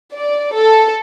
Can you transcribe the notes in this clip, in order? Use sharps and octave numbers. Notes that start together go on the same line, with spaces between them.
D5
A4